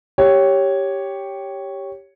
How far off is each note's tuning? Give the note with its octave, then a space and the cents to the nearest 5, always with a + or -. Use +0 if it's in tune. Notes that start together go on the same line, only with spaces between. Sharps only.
G4 +0 C#5 +0